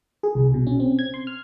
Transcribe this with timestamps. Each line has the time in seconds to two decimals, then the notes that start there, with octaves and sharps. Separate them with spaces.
0.23 G#4
0.35 C2
0.54 B2
0.67 C#4
0.80 C4
0.99 G#6
1.14 C6
1.27 F6